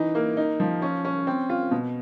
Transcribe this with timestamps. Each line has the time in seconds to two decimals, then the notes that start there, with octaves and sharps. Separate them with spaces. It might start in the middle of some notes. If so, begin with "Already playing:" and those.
Already playing: E3 D#4
0.15 A#3
0.37 D#4
0.60 F3
0.82 C#4
1.05 C#4
1.27 C4
1.50 F4
1.71 B2